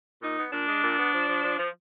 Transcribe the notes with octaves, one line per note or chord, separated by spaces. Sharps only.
A#2 D#4
B3
A#2 D4
G#3
A#2
B3
F3
F3
F3
F3